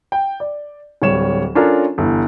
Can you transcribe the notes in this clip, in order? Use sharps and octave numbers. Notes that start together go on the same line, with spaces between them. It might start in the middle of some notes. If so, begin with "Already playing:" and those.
G5
D5
D1 G3 C#5 E7
C#4 D4 F4 A4 A#4 C#5
G1 E3